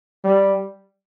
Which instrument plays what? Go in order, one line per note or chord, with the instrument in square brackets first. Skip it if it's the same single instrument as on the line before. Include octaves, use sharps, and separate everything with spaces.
[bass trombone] G3